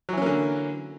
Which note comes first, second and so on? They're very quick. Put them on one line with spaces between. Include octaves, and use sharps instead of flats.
F#3 E3 C#4 A#3 D3